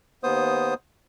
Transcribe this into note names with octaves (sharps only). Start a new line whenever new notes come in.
D#2 B3 C5 D#6